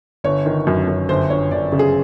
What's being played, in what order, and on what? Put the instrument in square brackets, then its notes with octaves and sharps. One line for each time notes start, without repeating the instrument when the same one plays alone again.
[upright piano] G1 C#5
D#3
F#2
F#2
G1 C5
G1 C#5
G1 D5
C#3
G#4